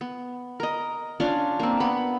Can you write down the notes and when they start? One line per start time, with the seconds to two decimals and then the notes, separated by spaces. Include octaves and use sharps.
0.01 B3
0.60 A#4 D#5
1.20 C#4 D4 F4
1.60 A#3 C4
1.80 B3 B5